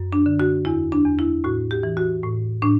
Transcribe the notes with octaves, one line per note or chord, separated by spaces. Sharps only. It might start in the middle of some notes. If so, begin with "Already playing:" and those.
Already playing: F#2
D4
D3
F#4
E2 E4
D4
E2
E4
A2 F#4
G4
E3
F#4
A2
A2 D4